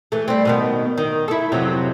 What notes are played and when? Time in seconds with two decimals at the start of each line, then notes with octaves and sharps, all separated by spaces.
0.12 E3 A3
0.28 G3 C4
0.45 B2 D#3 B3
0.98 D#3
1.28 E4 A4
1.52 F2 C3 F#3